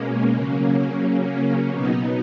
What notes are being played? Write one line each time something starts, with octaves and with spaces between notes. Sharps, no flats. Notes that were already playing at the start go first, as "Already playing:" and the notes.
Already playing: B2 G#3 A#3 C#4
C#3 F#3
B2 F#3 B3 D#4